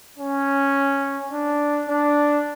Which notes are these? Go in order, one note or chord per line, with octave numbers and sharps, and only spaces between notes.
C#4
D4
D4